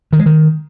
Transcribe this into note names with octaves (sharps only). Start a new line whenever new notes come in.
D#3
G#3
D#3